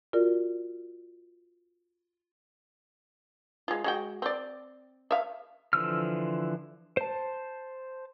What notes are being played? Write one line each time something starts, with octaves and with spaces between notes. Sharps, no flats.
F4 F#4 A#4 D5
G#3 F4
G#3 F#4 G5
C4 D5
E5 F5
D3 E3 F3 E6 F6
C5 A5